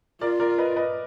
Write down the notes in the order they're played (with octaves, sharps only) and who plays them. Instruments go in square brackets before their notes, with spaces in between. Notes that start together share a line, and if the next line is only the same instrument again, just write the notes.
[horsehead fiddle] F4 [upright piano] A#4 D5
[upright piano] A#4 D5
B4 D#5
B4 D#5